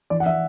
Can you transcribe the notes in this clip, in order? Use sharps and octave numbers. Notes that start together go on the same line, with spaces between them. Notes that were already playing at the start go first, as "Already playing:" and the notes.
E3 D5
F#5
E3 E5